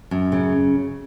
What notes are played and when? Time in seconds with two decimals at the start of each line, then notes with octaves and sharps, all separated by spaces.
0.11 F#2
0.32 C#3